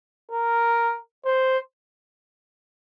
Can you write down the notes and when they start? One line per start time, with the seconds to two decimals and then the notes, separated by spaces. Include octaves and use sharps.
0.31 A#4
1.25 C5